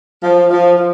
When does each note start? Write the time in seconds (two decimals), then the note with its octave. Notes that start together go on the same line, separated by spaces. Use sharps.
0.23 F3
0.51 F3
0.77 F3